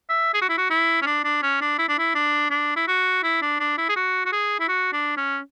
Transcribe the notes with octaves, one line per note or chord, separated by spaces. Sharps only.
E5
G#4
F#4
E4
F#4
E4
C#4
D4
D4
C#4
D4
E4
D4
E4
D4
D4
E4
F#4
E4
D4
D4
E4
G#4
F#4
F#4
G#4
E4
F#4
D4
C#4